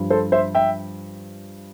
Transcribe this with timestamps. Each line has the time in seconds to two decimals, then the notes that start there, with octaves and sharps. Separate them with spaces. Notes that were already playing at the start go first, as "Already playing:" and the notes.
Already playing: G2 F3
0.10 A4 C5
0.32 C5 E5
0.55 E5 G5